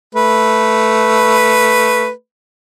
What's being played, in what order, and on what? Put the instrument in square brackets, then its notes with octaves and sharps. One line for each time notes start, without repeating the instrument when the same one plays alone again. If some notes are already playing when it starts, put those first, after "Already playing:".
[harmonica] A3 B4